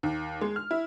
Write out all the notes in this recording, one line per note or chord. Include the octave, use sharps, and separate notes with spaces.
D#2
G#3
F6
E4